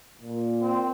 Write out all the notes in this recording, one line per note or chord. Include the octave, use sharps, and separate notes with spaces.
A#2
C4